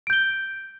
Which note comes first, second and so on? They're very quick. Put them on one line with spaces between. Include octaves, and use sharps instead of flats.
D7 G6 G7